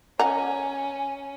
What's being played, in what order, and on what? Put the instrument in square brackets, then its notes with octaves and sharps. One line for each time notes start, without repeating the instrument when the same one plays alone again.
[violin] C#4 [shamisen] D#5 F#5 A#5 [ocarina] G#5